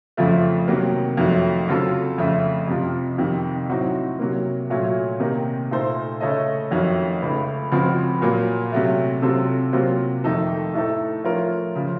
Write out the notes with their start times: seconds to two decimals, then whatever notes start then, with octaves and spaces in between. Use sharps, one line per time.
0.17 F2 C#3 F3 A3
0.67 C3 D#3 F#3 A#3
1.17 F2 D#3 F#3 A3
1.68 C#3 F#3 C4 F4 A4
2.18 F2 C#3 A3
2.68 F2 C3 F3
3.18 F2 C3 D#3
3.69 A2 F#3 C4 D#4 F#4
4.19 C3 F#3 A#3
4.70 A#2 F#3 A3 C#4
5.20 C3 D#3 A#3 D#4
5.71 A#2 A3 D#4 A4 C5
6.21 C#3 A3 C#4 A4 D#5
6.71 F2 D#3 F#3 A3 C#4
7.22 C#2 C#3 A3
7.71 C#2 C#3 F3 C4 F#4
8.22 A#2 F#3 A#3
8.72 C3 F#3 A3
9.22 C3 F#3 C4 F4 A4
9.73 C3 F#3 A#3 F4 C5
10.24 F2 D#3 A3 D#4 A4
10.74 A2 A3 D#4 A4
11.24 F3 A3 C#4 F4 A#4
11.75 C#3 F3